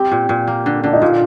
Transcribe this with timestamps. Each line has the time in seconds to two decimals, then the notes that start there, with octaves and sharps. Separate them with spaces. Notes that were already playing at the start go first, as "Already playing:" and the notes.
Already playing: C4 G4
0.11 A#2
0.29 A#2
0.47 A#3
0.66 D3
0.84 D3 D4
0.93 D#4
1.02 A#2 F4